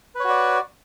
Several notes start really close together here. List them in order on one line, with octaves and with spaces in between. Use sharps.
B4 C#5 F#4 D5